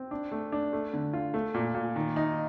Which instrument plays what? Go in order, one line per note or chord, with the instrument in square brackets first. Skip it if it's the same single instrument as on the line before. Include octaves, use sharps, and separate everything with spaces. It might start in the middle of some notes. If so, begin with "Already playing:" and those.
Already playing: [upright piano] C4
D4
A3
D4
A3
D3
F4
A3
A#2
A#2
D#3
D#4